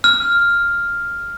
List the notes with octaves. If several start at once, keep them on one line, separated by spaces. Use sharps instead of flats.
F6